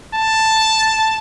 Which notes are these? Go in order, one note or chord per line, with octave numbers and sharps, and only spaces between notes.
A5